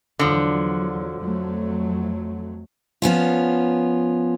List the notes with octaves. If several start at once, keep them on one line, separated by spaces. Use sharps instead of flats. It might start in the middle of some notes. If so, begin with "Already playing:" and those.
E2 D3 F3 F#3
F2 F#3 A3
F3 B3 C#4 F4